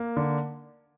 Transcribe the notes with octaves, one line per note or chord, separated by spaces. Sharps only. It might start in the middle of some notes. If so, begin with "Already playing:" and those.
Already playing: A#3
D3